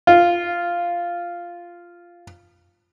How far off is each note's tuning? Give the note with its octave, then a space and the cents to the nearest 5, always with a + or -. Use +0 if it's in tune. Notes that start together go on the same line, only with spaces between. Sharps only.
F4 -5